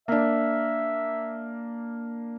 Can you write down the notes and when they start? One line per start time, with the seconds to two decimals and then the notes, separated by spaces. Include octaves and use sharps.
0.08 A#3 D4 E5